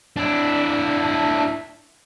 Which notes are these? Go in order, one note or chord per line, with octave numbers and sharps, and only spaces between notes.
D4 E4